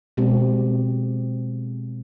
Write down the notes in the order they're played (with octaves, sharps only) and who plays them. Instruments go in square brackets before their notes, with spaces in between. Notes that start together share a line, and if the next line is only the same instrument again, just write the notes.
[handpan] B2 G#3 C4 G4